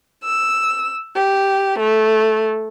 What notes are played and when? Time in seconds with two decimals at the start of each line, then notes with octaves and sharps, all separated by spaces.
0.24 E6
1.15 G4
1.79 A3